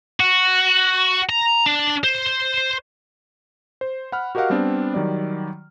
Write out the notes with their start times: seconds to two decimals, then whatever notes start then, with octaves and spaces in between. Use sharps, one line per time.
0.20 F#4
1.29 A#5
1.66 D4
2.04 C5
3.81 C5
4.12 F#5 B5 F6
4.35 F#4 G4 A#4 D#5 F5 F#5
4.50 G3 B3 C4 D4
4.94 D#3 F#3 G3 D5